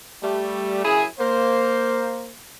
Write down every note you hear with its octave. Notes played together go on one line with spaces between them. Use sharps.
G3 A3
F#2 C#3 E4 G#4
A#3 C5